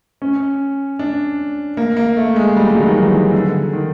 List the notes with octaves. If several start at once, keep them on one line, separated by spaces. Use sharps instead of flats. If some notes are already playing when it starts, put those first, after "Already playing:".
C#4
D4
A#3
A#3
A3
G#3
G3
G3
F#3
D#3
E3
D#3
D3
D#3